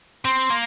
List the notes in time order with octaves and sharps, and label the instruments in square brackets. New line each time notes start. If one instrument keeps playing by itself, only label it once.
[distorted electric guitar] C4 [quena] C6
[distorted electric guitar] A#3